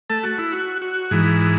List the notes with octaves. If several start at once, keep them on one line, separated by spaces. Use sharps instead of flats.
A3 A4
F#4
E4
F#4
F#4
G#2 E3